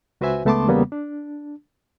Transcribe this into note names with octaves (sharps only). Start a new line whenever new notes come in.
C#2 F#4 B4 C5 E5 G#5
C#2 A3 B3 A5 C6 D6
E2 C#3 G3 A#3 B3
D4